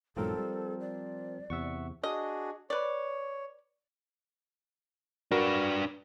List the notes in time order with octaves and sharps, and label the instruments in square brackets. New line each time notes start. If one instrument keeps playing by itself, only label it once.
[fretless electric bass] E1 G#2 F#3 [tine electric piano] F3 C4 A#4 [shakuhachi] A4
[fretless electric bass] G3
[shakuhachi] D5
[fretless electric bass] E2 C3 [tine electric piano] E5 F#5 C#6
[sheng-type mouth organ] D4 F#4 G#4 [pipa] D#5
[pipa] B4 D5 [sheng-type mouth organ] C#5
[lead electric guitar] D4 B4 [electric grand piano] F#4 A#4